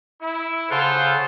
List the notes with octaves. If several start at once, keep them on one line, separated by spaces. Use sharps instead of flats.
E4
C#3 F4 A4 C5 F#5